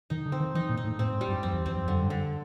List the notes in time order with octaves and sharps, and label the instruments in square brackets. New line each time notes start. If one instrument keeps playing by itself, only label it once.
[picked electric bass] D#3 [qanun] D#4
[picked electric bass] D3
[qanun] C4
[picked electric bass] D#3
[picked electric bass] E3 [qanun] D#4
[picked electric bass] A#2
[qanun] D#4
[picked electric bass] A2
[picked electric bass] A2 [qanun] C4
[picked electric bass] G#2
[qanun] G3
[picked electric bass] G2
[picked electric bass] F2 [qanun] C4
[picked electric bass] E2
[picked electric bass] E2 [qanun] C4
[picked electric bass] F2
[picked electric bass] F#2 [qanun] D3
[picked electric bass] G2
[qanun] D3